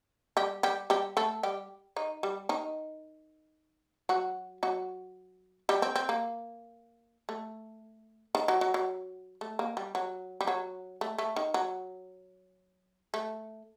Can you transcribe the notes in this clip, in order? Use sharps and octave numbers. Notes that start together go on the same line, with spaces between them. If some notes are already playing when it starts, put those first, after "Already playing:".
G3 G4
G3 G4
G3 G4
A3 A4
G3 G4
D#3 D#4
G3
D#3 D#4
F#3 F#4
F#3 F#4
G3 G4
C4
C4
A#3
A3
D#3
F#3
F#3
F#3
A3
A#3
G3
F#3
G3
F#3
A3
A3
D#3
F#3
A3